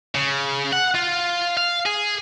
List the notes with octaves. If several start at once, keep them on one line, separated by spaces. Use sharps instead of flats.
C#3
F#5
F4
F5
G#4